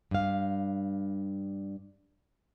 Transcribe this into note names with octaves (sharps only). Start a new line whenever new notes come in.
G2 F5